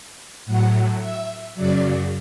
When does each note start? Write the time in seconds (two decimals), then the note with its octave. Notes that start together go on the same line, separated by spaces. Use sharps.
0.46 A2 F#3 F#5
1.00 E5
1.55 F#2 C#3 F#3 D5